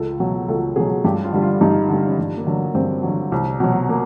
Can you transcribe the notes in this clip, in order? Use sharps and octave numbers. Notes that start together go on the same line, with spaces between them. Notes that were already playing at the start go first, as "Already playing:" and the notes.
Already playing: C#2 A4
B2 F#3
C#2 A4
B2 F#3 G#4
G2 G4
F4
D3 G3
F4
G2 D#4
D3 G3
C#4
G2 D4
A#3
D3 F#3
G2 C4
D3 F#3
C2
B2 F#3
A#3